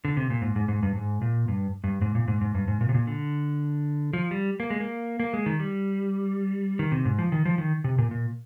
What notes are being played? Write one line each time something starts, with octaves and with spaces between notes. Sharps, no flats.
D3
C3
A#2
G#2
G#2
G#2
G2
G#2
A#2
G2
G2
G#2
A#2
G#2
G#2
G2
G#2
A#2
C3
A#2
D3
F3
G3
A#3
G#3
A#3
A#3
G#3
D#3
G3
D#3
C3
G#2
F3
D#3
F3
D#3
C3
A#2
A#2